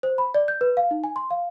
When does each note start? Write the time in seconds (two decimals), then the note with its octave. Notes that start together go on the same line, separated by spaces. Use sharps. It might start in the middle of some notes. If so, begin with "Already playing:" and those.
0.03 C5
0.18 B5
0.34 D5
0.48 G6
0.61 B4
0.77 F5
0.91 D#4
1.04 G#5
1.16 C6
1.31 F5